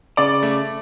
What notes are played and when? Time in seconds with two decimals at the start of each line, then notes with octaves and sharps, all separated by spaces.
0.17 C#3 D5
0.43 A3